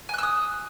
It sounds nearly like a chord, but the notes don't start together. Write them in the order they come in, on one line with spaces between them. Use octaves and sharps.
G#5 F#6 E6 D#6